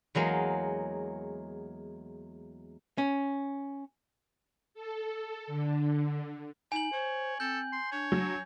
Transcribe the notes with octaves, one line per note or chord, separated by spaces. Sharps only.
E2 F#3 G#3 A#3
C#4
A4
D3
D#4 G#5 F#7
C5 C#5
C4 A4 G6
C6
D4 C#5
F#3